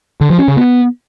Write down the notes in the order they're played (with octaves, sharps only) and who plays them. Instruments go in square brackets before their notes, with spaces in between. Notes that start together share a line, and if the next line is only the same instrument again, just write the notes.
[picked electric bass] D3
F3
C#4
C#3
B3